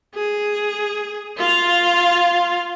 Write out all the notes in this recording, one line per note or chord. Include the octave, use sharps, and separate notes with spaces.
G#4
F4 F5